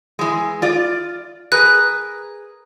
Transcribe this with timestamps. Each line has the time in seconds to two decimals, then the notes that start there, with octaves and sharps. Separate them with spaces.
0.19 E3 G#3
0.62 F4 D5
1.52 G#4 A#4 B4 F#6